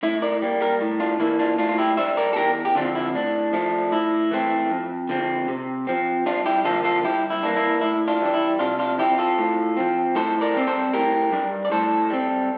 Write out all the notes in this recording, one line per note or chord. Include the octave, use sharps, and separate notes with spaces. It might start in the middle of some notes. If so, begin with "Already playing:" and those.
A2 E4
A#4 D5
G3 A#3
G4 A#4
A2
D4 F4
E3 A#3 D4 E4
D4 F4
A2 D4 F4
F4
E4 G4
G3 D4 C5 E5
A#4 D5
A4
E2 G4 A#4
G4
D3 F3 C4 D4 F4
E4
A2 D4
F3 A3 D4
A2 E4
E3 A3 C4
F2
D3 F3 C4
C3
F3 C4
G2 D4 F4
E4 G4
D3 F3 A#3 F4 A4
F4 A4
G2 E4 G4
E4
E3 A#3 D4
E4
A2 E4
D4 F4
E3 G3 D4
E4
C3 D4 F4
D4 F4
F3 C4 E4 G4
F4 A4
A2
F3 C4
A2 A4 C5
A#4 D5
G3 C4
A4 C5
A2 G4 A#4
G3 D4
D5
A2 A4 C5
G3 C4